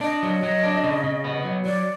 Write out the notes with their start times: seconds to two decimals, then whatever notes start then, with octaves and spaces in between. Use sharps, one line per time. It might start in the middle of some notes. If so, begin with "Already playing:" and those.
0.01 D4 D#5
0.23 F#3
0.43 F#3
0.63 D4
0.84 C#3
1.04 C#3
1.24 B3
1.44 F#3
1.66 F#3 D5